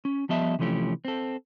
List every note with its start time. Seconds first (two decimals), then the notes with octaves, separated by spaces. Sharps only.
0.05 C#4
0.29 F3 G3 B3 D#5 E5 A5
0.59 C3 E3 F3 A3 C#4 G4
1.05 C4 A4